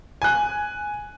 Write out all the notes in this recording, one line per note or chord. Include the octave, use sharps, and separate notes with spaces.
G#5 F#6